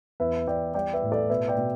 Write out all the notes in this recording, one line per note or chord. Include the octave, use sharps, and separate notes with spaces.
E2 B4 E5
E2 D5 G5
G3 D5 G5
B4 E5
A2
A4 D5
B2 B4 E5
D5 G5
B2